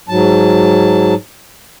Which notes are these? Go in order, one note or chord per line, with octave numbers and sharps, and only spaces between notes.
G#2 F#3 A5